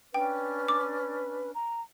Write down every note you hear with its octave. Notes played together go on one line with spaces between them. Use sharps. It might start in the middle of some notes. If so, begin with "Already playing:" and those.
C#4 D4 B4 G5
D6
A#5